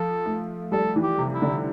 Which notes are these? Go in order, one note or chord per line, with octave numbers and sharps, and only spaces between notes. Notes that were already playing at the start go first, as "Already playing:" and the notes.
Already playing: F3 A4
A3
G3 A4
E3
G4
C3
E4
D3